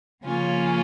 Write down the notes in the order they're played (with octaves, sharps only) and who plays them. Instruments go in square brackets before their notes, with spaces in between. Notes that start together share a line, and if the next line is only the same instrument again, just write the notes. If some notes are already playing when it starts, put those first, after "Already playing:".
[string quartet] C#3 F3 A#3 C#4 F4